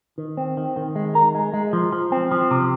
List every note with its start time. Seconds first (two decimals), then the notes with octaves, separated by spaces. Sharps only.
0.18 D#3
0.37 C4
0.57 D#3
0.77 D#3
0.96 G#3
1.15 A#4
1.35 G#3
1.54 G#3
1.73 F3
1.93 F3
2.12 C4
2.31 F3
2.51 C3